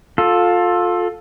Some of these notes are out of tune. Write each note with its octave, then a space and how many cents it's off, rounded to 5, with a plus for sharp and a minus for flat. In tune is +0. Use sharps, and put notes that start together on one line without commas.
F4 +25 A4 +0